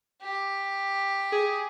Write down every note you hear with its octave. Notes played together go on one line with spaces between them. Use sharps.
G4
G#4